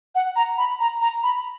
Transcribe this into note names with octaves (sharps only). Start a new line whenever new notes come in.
F#5
A#5
B5
A#5
A#5
B5